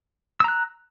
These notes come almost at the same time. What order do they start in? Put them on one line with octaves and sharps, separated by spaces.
E6 A#5 F#6